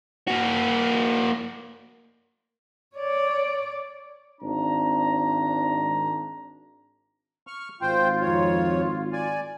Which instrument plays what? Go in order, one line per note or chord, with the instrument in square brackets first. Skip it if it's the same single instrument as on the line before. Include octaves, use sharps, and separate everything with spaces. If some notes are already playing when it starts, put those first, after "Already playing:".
[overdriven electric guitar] A#3 F#4
[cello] C#5 D5
[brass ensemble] G#1 D4 A#5
[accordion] C#6 F6
[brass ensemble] G#1 F4 [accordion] C5 G5
[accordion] F2 C#5
D5 G#5